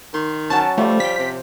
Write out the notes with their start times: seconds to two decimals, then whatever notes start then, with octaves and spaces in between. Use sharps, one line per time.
0.14 D#3 C6
0.50 F#3 C#4 A5
0.78 F3 G3 A3
1.00 F5 G5 B6
1.18 C3